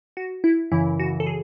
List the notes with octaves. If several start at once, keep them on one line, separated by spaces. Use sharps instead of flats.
F#4
E4
F#2 C#3 E3 E4
F#4
A4
G#4